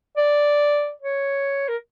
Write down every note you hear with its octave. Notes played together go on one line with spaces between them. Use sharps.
D5
C#5
A#4